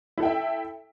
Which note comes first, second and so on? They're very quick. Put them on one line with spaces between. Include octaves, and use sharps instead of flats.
E4 A4 G5 E5